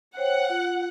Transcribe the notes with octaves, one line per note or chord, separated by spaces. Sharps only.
C5 C#5 F#5 G5
F4